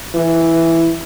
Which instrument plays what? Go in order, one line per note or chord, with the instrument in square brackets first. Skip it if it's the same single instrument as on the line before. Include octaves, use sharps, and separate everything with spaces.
[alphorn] E3